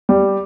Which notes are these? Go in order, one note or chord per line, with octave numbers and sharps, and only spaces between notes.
G3